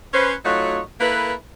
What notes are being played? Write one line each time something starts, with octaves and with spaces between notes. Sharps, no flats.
C#4 B4 C5
F#3 A3 D#4 F4 F#4 C#5
A#3 E4 A4 B4